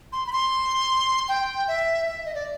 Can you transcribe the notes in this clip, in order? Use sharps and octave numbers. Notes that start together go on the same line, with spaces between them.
C6
B5
C6
G5
E5
E5
D#5
D5